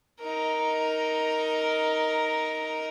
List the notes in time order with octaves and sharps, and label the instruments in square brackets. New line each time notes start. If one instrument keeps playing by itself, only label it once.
[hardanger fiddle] D#4 A#4